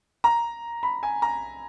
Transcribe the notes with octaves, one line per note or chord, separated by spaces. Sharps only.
A#5
B5
G#5
A#5